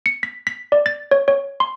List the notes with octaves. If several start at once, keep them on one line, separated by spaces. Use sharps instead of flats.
C#7
B6
B6
D5
A6
C#5
C#5
C6